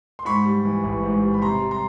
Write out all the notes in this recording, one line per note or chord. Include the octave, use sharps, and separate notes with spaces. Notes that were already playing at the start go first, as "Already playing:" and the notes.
C6
G#2 B5 C#6
G3
E3
A1
G#2
G3
B5
C3 A#5 C6
G3
A#5 C6